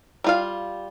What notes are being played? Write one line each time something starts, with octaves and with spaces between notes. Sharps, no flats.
G3 F4 F5